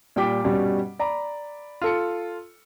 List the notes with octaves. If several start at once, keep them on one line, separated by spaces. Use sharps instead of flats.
A#2 G3 G5 D6 B6
G2 B2 G3 C#4
D5 A#5 B5
F4 A4 C#7